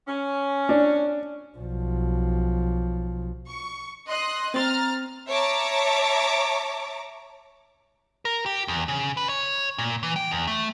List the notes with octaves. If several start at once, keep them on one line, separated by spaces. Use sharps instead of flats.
C#4
D4
B1 F3
C#6
D#5 C6 F#6
C4 A#5 C6 F6 A6
C#5 E5 A5 A#5 D6
A#4
G4
E2
C#3
B4
C#5
A#2
E3
G5
E2
A3